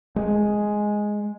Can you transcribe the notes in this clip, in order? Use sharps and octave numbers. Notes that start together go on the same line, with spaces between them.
G#3